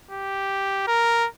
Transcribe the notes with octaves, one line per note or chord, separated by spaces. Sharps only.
G4
A#4